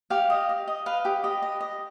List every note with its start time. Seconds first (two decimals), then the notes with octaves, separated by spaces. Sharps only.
0.10 G4 F5
0.30 D#5
0.49 D#5
0.67 D#5
0.86 B4 F5
1.05 G4
1.24 G4 D#5
1.42 D#5
1.60 D#5